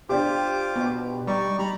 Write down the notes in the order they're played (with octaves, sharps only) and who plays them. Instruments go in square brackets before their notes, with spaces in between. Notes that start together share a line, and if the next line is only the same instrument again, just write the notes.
[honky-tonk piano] D4 G4 [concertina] F4 C5 D6
[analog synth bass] B2
[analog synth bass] G3 [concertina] D#4 D5 C#6
[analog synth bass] G3 [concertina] A#5 B5